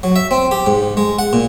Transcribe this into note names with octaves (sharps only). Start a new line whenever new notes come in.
F#3
E5
C4
G4
G#2
G#3
F#5
A#2